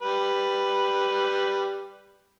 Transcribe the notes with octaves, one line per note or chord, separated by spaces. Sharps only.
G3 B4